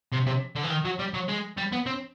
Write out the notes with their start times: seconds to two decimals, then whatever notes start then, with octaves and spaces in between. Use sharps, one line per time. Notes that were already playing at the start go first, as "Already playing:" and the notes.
0.12 C3
0.26 C3
0.56 D3
0.64 E3
0.70 D#3
0.85 F#3
0.99 G3
1.14 F#3
1.28 G#3
1.57 G3
1.72 B3
1.86 C4